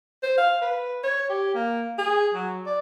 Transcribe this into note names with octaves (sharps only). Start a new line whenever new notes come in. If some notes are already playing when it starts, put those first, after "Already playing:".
C5
F5
B4
C#5
G4
A#3
G#4
F#3
D5